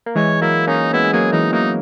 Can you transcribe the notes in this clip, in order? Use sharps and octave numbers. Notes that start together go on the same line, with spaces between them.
A#3
E3 G#3 C#5
F#3 A#3 E4
A#3 C#4 D#4
G#3 B3 E4
G#3
F#3 A#3 G#4
E3 G#3 D#4
F#3 A#3 D#4